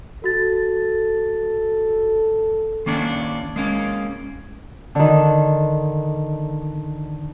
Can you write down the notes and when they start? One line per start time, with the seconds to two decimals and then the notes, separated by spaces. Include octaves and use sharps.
0.24 F#4 A4 A6
2.86 D#3 A#3 C#4 D4
3.56 G#3 A#3 C#4
4.95 D3 D#3